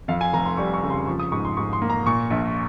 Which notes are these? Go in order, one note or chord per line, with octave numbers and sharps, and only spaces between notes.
F2 F5
G#5
F1 A#5
C6
G3 C#6
C#6
C#3
C6
F3 C#6
D#6
G#2 C#6
C6
G#2 C#6
C6
A#3
A#5
A#2 C#6
A#1